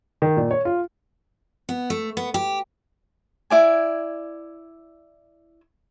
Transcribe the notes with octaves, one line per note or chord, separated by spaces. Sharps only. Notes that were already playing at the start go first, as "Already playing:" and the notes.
D#3
A#2
C#5
F4
B3
A3
B3
G4
E4 D5 G#5